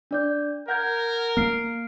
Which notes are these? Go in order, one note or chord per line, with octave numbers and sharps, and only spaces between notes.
D4 D5 G6
A#4 F#5 G6 G#6
A#3 F6 C7 D7